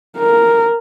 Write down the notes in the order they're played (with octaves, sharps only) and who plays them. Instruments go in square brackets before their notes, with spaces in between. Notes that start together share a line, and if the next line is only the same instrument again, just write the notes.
[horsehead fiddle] A#4